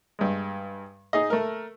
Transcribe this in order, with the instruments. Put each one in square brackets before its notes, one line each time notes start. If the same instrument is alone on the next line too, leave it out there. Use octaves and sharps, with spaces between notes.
[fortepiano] G2 G#3
D#4 G#4 D#5
A3 A#4